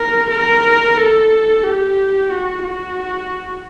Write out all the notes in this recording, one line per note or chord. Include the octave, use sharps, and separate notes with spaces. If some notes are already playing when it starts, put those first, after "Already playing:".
Already playing: A#4
A#4
A4
G4
F#4
F#4